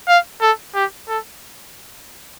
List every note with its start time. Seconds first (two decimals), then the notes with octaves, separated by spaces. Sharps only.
0.08 F5
0.41 A4
0.75 G4
1.08 A4